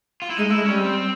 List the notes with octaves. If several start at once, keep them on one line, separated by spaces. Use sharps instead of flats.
F4
E4
G#3 D#4
A3 E4
G#3
G3 C#4
C4